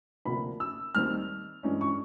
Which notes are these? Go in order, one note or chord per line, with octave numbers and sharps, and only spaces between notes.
D2 C3 F3 A#3 D4 B5
E6
D#2 D#3 G3 C4 F6
G2 E3 G#3 C#4
C#6